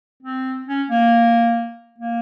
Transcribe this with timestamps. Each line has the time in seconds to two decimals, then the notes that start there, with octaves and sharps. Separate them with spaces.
0.23 C4
0.67 C#4
0.89 A#3
1.99 A#3